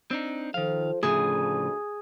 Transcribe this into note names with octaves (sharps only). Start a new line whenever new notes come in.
C4 D4 D#4
D#3 F3 A4 C5 F5
D2 A2 C#3 F3 G#4